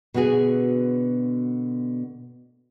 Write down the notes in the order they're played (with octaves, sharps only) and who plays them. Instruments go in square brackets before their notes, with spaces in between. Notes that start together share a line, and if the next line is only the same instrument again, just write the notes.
[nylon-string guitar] B2 D3 B3 F#4 G#4